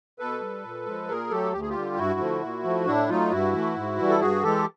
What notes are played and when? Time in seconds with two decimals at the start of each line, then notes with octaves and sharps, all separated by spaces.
0.19 B2 A4 B4
0.41 G3
0.64 A#2
0.86 F3 G#3
1.08 A#2 G#4 A#4
1.30 F#3 A3 G4 A4
1.53 D2 G4
1.61 G#4
1.69 F4 G4
1.76 D3 G3
1.97 G2 E4 F#4
2.19 D3 F3 A3
2.42 A#2
2.64 F3 A3
2.86 A2 D4 E4
3.09 F#3 A3 D#4 F4
3.31 G2 E4 F#4
3.53 E3 A3
3.76 G#2
3.98 E3 G3
4.09 A4
4.20 G2 F#4 G#4
4.42 E3 G#3 G4 A4